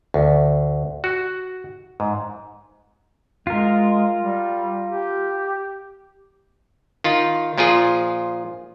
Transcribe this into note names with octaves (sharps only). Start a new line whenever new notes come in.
D2
F#4
G#2
G#3 F4 A#4
G3
G4
D#3 F4
A#2 F3 F4 G#4